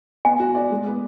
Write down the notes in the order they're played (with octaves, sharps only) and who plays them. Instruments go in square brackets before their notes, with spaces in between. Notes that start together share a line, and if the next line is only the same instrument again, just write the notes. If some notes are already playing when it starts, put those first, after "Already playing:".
[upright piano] B3 [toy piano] G#5
[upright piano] F#4
D5
G#3
B3